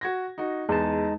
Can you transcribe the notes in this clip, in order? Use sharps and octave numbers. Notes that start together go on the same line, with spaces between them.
F#4 G#6 A#6
D#4 F#4
E2 G#3 D#4 A5